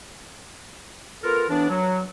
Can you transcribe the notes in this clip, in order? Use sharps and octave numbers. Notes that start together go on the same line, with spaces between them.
B3 F4 A4 A#4
A2 E3 B3 D4
F#3